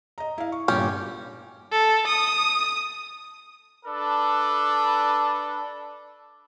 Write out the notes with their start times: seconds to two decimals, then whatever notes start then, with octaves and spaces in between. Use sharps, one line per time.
0.18 D#5 A#5
0.38 E4 F5
0.52 C#6
0.68 G1 G2 A#2 C#4 G4
1.72 A4
2.07 D#6
3.85 D4 A4 B4